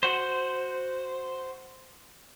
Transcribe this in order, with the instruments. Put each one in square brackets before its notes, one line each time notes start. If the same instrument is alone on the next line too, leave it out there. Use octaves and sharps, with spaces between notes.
[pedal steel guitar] F#4 C5